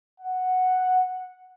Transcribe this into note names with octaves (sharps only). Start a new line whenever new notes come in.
F#5